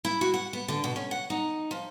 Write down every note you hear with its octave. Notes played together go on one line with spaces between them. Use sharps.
E4
F#4
F#5
B3
D3
B2
C#4
F#5
D#4
F3